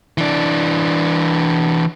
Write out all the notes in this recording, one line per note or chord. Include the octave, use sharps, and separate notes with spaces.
E3 D4